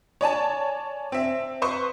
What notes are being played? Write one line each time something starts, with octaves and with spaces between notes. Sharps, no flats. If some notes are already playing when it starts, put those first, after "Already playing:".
C#5 D5 G#5 A5
C4 E5
B4 C5 C6 C#6